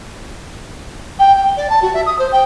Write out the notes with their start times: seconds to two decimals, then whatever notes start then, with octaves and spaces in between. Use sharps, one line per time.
1.19 G5
1.35 G5
1.56 D5
1.69 A5
1.82 F#4
1.93 E5
2.06 D#6
2.18 C5
2.32 G5